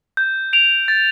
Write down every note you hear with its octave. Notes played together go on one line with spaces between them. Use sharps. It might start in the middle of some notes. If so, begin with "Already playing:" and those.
G6
D7 F7
A6